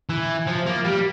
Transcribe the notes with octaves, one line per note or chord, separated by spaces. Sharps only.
E3
F3
A#3
G3